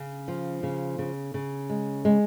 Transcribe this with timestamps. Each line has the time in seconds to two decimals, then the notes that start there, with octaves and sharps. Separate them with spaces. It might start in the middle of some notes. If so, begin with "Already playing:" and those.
Already playing: C#3
0.28 F3
0.63 C#3
0.99 C#3
1.34 C#3
1.70 G#3
2.05 G#3